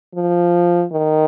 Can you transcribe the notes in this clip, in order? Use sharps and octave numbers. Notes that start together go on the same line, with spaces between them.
F3
D#3